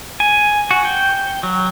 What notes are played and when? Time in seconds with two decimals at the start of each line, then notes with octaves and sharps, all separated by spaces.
0.20 G#5
0.71 F#4
0.85 G5
1.43 F#3